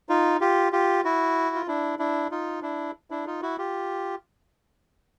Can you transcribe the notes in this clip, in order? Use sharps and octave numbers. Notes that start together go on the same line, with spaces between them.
D#4 F4
F4 G4
F4 G4
E4 F#4
F4
D4 E4
D4 E4
D#4 F4
D4 E4
D4 E4
D#4 F4
E4 F#4
F4 G4